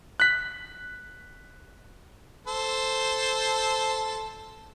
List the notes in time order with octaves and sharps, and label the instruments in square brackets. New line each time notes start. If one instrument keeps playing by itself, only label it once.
[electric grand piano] F#6 B6
[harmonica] A4 C5